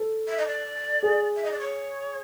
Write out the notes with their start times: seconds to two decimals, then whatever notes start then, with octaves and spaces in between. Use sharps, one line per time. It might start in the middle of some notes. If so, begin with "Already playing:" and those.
Already playing: A4
0.28 E5
0.38 D#5
0.46 D5
1.03 G#4
1.36 E5
1.44 D#5
1.51 D5
1.59 C#5